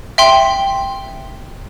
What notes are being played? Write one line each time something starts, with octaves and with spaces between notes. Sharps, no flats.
E5 G5 C6